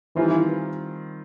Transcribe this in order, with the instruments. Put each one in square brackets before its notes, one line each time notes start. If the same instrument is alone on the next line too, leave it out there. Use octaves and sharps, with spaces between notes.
[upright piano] D#3 G3 C4 F4 [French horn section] E3